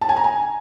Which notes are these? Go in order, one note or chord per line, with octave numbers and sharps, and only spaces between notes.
A5
G#5
A#5
G#5